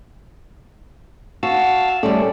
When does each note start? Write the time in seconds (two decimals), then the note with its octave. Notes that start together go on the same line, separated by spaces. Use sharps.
1.43 F#4 F5 A5 E6
2.03 G3 A3 C#4 A4 D5